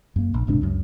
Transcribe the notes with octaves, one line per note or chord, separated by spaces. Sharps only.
F#2 A#3
A#1
D#1 G#2 C3 D4
C#2 F#2